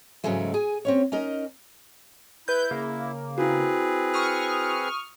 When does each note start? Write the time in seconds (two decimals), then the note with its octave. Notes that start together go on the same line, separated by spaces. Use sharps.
0.24 G#2 C#3 E3 F#3 G#3 A3
0.54 G#4 G#5
0.85 C4 C#4 C#5
1.12 C#4 D#4 A#4 D#5
2.48 E4 B4 G6
2.71 C#3 A#3
3.38 C4 E4 F#4 G#4 B4
4.14 C#6 D#6 F6